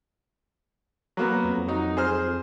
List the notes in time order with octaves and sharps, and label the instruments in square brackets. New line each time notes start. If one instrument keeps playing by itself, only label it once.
[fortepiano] F#3 A#3 B3
[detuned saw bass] F2
[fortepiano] F#3 D#4
G#4 C5 F6